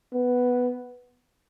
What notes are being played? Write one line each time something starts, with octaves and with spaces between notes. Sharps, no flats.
B3